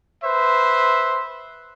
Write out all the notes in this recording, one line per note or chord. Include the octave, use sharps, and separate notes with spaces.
B4 C5 E5